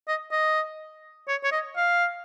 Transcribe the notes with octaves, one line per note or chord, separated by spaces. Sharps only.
D#5
D#5
C#5
C#5
D#5
F5